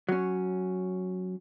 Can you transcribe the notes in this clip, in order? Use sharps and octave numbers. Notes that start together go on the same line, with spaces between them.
F#3 C#4